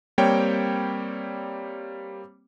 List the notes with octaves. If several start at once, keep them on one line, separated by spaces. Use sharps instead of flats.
G3 A#3 C4 C#5 G5